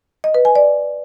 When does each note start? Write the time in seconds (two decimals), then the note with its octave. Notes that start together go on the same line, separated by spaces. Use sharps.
0.24 D#5
0.34 B4
0.45 G#5
0.56 D5